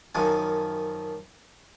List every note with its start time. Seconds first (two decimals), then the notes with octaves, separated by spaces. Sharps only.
0.15 F#2 D#3 F3 G#5